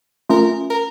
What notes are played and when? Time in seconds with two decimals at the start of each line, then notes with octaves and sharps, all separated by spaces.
0.29 A3 C#4 F4 A#4
0.70 A#4